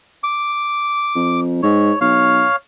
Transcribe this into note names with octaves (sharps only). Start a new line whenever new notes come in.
D6
F2
G#2 C#5
B1 C#5 F5